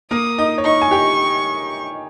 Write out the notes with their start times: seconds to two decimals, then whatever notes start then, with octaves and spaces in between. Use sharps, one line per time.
0.11 A#3 A#4 D#6
0.38 D#4 D#5
0.58 C#5
0.65 D#4 D#5 C#6
0.82 G#5
0.91 G4 G5